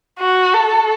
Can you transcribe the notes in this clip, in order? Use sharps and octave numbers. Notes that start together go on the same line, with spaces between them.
F#4
A4